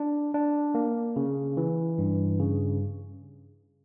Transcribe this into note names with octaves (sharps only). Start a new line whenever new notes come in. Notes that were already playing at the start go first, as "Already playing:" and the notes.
Already playing: D4
D4
A#3
C#3
E3
G2
C#3